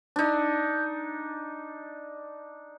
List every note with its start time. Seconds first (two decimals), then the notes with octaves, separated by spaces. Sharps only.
0.16 D4 D#4